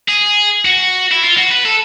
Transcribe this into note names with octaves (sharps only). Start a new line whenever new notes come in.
G#4
F#4
E4
F4
F#4
B4
A4